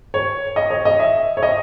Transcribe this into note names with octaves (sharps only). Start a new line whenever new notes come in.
C#5
D#5
C#5
D#5
E5
C#5
D#5